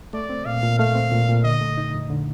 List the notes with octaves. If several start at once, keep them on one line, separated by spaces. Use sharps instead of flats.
A3 D5
C4
A#2 F5
A#2
A3 F5
C4
A#2
A#2
D3 D#5
A3
D#4
F2
D3